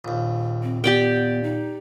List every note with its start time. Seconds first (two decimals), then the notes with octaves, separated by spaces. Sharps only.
0.05 A#1 D#2
0.63 C4
0.84 B3 G4 D5 G5
1.43 D#4